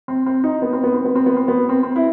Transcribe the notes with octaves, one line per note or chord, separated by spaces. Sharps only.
C4
C4
D#4
B3
C4
B3
C4
B3
C4
B3
C4
B3
C4
C4
E4